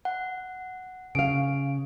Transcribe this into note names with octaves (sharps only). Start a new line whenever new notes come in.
F#5
C#3 F5 D7